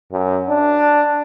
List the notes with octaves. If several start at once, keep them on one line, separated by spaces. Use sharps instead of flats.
F#2
D4